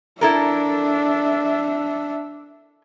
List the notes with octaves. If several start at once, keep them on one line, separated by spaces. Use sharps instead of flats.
D4 E4 A4 A#4 E5